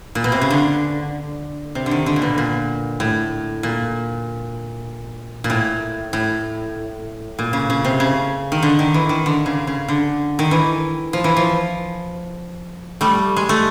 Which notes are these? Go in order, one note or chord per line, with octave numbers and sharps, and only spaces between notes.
A#2
B2
C3
C#3
D3
C3
D3
D#3
D3
A#2
B2
A#2
A2
A#2
A#2
A2
A2
A#2
C#3
C#3
C3
C#3
D#3
D3
D#3
E3
D#3
D3
C#3
C#3
D3
D#3
E3
F3
E3
F3
G3 A3
G#3
A3